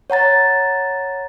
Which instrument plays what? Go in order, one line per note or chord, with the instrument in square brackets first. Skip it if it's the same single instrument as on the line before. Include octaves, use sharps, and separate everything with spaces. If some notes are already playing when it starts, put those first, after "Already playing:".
[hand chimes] C#5 F#5 A#5 A6